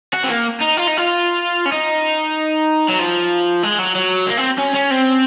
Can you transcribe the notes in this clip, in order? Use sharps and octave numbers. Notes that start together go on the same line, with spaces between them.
F#4
C4
A#3
D#4
F4
D#4
F4
C#4
D#4
F#3
F3
G#3
F#3
F#3
A#3
C4
C#4
C#4
C4